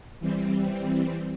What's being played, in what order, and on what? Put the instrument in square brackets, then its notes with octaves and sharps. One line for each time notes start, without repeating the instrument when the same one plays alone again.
[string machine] E3 G3 C4